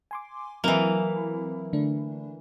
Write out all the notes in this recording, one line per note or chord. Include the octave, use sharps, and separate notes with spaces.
G#5 C6 D6
E3 F#3 A#3 C4 E4
D3 A3 D4